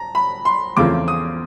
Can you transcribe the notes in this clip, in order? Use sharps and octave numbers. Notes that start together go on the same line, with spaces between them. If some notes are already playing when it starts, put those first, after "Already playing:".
Already playing: A5 A#5
B5
C6
E2 C#3 F3 A3 C4 D6
D#6